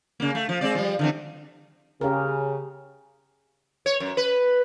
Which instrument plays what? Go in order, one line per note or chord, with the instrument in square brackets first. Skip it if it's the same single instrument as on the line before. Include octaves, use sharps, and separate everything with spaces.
[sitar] C#3 A#3
A3
F3
G#3 C4 D5
F3 G3
D3 E3 C4
[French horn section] C#3 [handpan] G4 G#4 A#4
[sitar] C#5
F#2
B4